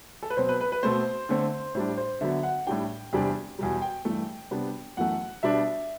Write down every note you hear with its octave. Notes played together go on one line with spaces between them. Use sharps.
A4
B4
B2 F#3 C4 C5
B4
B4
B4
B2 A3 C4 C5
D3 A3 C4
A2 G3 D4 C5
C5
D3 F#3 B3 E5
F#5
A2 G3 D4 G5
E2 C3 G3 D4
E2 B2 G3
G5
G2 E3 A3
C3 G3 B3 D4
F#2 E3 A3 F#5
B2 G3 B3 D4 E5